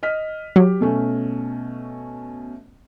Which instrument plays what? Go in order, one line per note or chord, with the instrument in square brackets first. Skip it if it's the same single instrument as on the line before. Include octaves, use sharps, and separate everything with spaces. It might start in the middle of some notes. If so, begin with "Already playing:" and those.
[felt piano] D#5 F6 B6
[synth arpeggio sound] F#3 [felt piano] G4
[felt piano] B2 A3 C#4